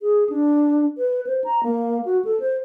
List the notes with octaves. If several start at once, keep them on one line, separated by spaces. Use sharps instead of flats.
G#4
D4
B4
C5
A#5
A#3
F#4
A4
C5